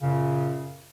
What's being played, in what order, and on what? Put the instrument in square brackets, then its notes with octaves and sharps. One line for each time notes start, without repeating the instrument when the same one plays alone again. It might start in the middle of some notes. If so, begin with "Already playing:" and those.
[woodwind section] F#2 A#2 C#3